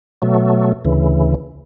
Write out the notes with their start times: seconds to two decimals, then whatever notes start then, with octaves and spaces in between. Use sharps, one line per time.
0.22 B2 F#3 A3
0.85 D2 C#3 E3